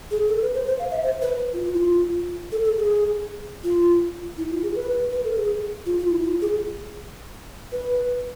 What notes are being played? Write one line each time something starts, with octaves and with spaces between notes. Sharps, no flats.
G#4
A4
B4
C5
C5
F5
E5
C5
B4
F4
F4
E4
F4
A4
A4
G#4
F4
E4
F4
G#4
B4
B4
A4
G#4
F4
F4
E4
F4
G#4
B4